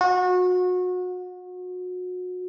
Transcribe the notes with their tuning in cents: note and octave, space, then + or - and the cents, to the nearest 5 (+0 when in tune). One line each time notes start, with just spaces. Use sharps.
F#4 -30